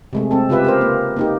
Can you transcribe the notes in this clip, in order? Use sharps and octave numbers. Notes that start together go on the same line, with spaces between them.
C3 G#3 A3
G#3 C4 A4
C#3 F4 G4 B4 E5
G4 A#4 C5
A#3
A#3 D#4 G4